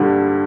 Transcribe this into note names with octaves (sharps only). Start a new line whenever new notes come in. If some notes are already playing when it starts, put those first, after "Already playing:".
Already playing: G2 D3 G3